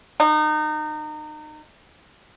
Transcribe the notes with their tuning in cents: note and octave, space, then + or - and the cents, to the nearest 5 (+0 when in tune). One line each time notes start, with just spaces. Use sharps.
D#4 -30